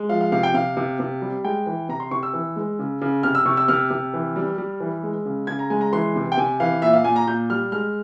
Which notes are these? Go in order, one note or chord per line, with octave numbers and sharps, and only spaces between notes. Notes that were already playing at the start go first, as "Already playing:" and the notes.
Already playing: G#3
F3 F5
F5
C3 F5
G5
C3 F5
C3
C3
G3
G#3 G5
E3
C3 A#5
C6
C3 C#6
E6
E3
G#3
C#3
C#3
C3 F6
E6
C3 C#6
E6
C3 F6
C3
E3
G3
G3
E3
G#3
C#3
C#3 G#6
A#5
G#3 G#5
A#5
E3 C6
C3
G5
C3 G#5
E3 F5
A#2 E5
F5
A#2 G#5
A#5
A#2 G6
G3 F6
G#3 F6